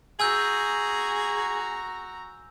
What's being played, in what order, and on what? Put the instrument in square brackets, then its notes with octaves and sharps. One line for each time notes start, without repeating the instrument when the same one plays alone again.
[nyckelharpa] F#4 A#5 [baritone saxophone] G#4 [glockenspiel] G#5 E6 G6